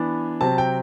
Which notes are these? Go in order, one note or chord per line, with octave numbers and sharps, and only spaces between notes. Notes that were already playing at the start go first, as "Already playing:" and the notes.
Already playing: E3 B3 D4
C3 F#3 C4 A5
G5